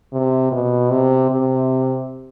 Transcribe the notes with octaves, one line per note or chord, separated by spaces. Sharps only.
C3
B2
C3
C3